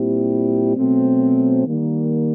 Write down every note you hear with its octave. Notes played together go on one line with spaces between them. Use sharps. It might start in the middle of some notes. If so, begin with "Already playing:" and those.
Already playing: A#2 G3 C4 E4 G4
B2 F#3 A3 C4
D#3 G3 A#3